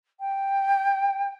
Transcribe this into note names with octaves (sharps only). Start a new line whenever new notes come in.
G5